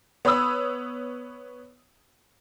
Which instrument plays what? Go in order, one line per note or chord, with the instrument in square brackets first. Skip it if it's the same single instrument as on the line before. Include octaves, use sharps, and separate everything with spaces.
[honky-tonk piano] B3 C#5 B5 D#6 E6